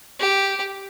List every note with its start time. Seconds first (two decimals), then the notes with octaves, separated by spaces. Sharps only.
0.19 G4